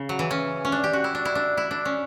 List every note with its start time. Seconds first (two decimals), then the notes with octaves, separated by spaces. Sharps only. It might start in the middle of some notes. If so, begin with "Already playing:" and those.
Already playing: C#3
0.09 F#3
0.19 E3
0.31 C#4
0.65 C#4
0.72 D4
0.84 G4
0.93 F#4
1.04 E4
1.15 D4
1.25 E4
1.35 D4
1.57 E4
1.71 D4
1.85 C#4